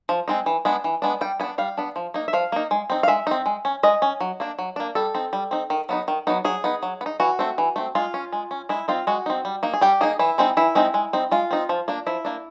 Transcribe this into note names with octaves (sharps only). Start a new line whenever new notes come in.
F3
G#3 C4 D#4
E3
G#3 B3 D4
E3
G#3 B3 D4
G3 G5
B3 D4 G#5
G3 F5
B3 D4
F3
A#3 D#4
E5
F3 F5
A#3 D#4
G#3
C4 D#4
F5
G#3 E5
C4 D#4
G#3
C#4
G#3 D#5
C#4
F#3
A#3 D4
F#3
A#3 D4
G3 A4
C4 D#4
G3
C4 D#4
D#3
F#3 B3 D#4
D#3
F#3 B3 D#4
F#3 G#4
B3 D#4
F#3
B3
D#4
E3 F#4
A3 C4
E3
A3 C4
G#3 F4
C#4
G#3
C#4
G#3 E4
C4 D#4 F4
G#3 F#4
C4 D#4
G3
A#3 D#4
G#4
G3 G4
A#3 D#4 G#4
E3 E4
G#3 C4 D#4
E3 E4
G#3 C4 D#4
G#3
C4 D#4
G#3 F4
C4 D#4
F3
A#3 D4
F3 E4
A#3 D4